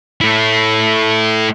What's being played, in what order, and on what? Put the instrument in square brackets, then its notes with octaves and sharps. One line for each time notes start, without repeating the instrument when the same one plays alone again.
[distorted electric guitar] A3 E4